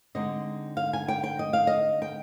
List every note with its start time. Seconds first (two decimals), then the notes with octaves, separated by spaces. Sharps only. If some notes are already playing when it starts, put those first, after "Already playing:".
0.15 D3 G#3 C4 D#4 D#5
0.77 F5
0.93 G#5
1.08 G5
1.24 G5
1.39 D#5
1.53 F5
1.67 D#5
2.02 G5